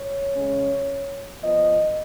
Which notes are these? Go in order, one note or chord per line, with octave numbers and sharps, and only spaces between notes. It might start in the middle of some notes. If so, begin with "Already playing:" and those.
Already playing: C#5
C#3 G#3 C#4
F3 B3 D#5